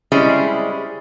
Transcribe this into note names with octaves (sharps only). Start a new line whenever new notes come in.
G3 G#3 C4 C#4 E4 G#4